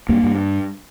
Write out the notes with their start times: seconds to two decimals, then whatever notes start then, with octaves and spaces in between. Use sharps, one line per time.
0.09 G2 A#3
0.23 G2